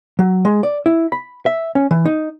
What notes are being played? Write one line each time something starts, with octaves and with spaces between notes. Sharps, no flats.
F#3
G#3
D5
E4
B5
E5
C#4
E3
D#4